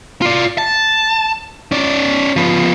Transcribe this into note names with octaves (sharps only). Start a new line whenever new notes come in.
F4 D5
A5
C#4 D5
F3 B3